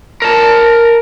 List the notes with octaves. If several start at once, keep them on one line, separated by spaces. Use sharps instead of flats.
A#4 A5